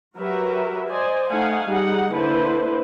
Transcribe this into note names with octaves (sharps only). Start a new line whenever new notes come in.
F#3 F#4 G4 A#4 B4 E5
C5 D5 D#5 G#5
A3 D#4 F5 F#5 G#5
G3 D#4 G#4 F#5
D3 A#3 E4 B4 C5